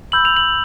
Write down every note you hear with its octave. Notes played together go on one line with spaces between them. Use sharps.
B5 E6 G6 F#7
F7
F#7